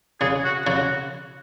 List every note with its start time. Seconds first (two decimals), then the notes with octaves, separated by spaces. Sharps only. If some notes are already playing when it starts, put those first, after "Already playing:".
0.21 C#3 G#4
0.44 F#4
0.67 C#3 F#4